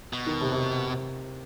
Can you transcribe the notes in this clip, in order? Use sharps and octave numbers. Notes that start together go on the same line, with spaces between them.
B2
D#3
C3
C3